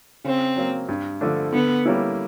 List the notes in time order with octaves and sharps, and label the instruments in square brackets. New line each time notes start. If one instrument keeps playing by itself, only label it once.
[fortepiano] C#3 [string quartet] C4
[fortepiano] F#3 A#3
G2
D3 F3 A3 D4
[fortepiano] D3 [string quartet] B3
[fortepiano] G3 A#3 C#4 E4